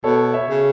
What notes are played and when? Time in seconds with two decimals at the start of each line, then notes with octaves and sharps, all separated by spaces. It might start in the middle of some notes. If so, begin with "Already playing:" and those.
0.04 B2 A4 C#5
0.34 C#5 E5
0.49 C#3